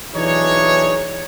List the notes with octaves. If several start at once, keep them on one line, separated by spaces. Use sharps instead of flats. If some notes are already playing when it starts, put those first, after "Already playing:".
B1 E3 D4 D#4 G#4 C#5